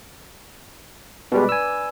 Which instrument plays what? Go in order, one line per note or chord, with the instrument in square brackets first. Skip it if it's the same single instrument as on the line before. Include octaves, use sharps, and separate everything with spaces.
[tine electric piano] B2 G3 G#3 [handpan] B4 D5
[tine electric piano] G#5 E6